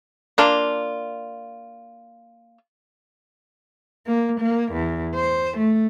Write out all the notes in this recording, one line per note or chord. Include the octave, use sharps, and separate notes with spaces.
A#3 D4 F4
A#3
A#3
E2
C5
A3